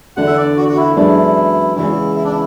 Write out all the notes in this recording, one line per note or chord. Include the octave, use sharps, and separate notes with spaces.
E2 D3 A3 D4 F#5
E5
D5
F#4
F#4
E4
F#2 E3 G#3 B3 D4 E4
E2 C#3 E3 G#3 E4
E4
D4
E4